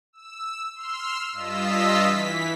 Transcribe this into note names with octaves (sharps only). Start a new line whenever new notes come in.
E6
C6 E6 F6
G2 F4 D#5 E6 B6
E3 B6